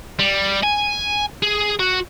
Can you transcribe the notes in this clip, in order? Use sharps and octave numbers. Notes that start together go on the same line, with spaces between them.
G3
G#5
G#4
F#4